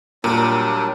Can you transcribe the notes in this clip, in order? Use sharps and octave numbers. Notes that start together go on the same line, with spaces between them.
A#2 F#3 G3 D4 A#4